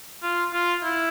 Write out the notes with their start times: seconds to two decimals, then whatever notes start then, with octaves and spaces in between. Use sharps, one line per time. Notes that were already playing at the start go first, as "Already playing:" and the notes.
0.23 F4
0.53 F4
0.84 E4